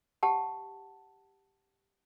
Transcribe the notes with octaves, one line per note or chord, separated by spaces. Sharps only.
G4 F#5 A5